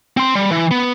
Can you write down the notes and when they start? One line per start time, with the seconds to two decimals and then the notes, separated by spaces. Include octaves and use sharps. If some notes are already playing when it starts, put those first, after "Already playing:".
0.17 C4 C6
0.35 G3
0.51 E3
0.71 B3